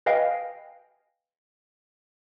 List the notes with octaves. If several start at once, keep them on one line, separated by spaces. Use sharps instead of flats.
B4 D#5 F5 G5 G#5